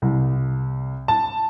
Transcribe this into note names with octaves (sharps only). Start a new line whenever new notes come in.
C2
A5